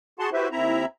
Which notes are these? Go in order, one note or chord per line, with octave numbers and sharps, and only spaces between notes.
F#4 G#4 F#5 A5 C6
E4 F#4 G4 B4 C5 E5
D#2 C4 E4 E5 A#5